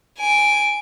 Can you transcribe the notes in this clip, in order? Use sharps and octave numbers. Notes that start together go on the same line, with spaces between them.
G#5 D7